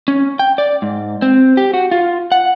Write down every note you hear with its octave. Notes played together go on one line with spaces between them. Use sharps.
C#4
G5
D5
G#2
C4
G4
F#4
F4
F#5